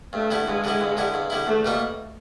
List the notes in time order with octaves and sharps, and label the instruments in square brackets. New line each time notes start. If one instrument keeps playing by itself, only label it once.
[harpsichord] G2 [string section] A3
[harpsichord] D3 G3 B3 E4
[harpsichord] G2 [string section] G#3
[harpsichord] D3 G3 B3 E4
G2
D3 G3 B3 E4
G2
D3 G3 B3 E4
[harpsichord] E2 [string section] A3
[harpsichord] B2 G3 A#3 D#4